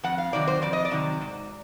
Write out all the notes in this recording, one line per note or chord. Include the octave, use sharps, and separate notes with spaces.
F2 F#5
F5
C3 D#3 F#3 D5
C5
F2 D5
D#5
D5
C3 D#3 F#3
G#2